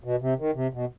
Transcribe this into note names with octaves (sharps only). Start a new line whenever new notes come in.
B2
C3
D#3
C3
B2